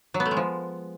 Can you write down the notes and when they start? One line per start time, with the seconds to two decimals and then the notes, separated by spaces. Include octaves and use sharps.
0.14 F#3
0.20 B3
0.25 A3
0.31 G#3
0.37 F3